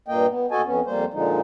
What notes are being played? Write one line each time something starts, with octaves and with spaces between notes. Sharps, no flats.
G2 A#2 A#3 D#5 G5
B3
D#2 F#4 A4 D#5 G#5 A5
F2 B3 C#4
F2 G3 A#3 C5
A#2 D3 F3 G#3 D#4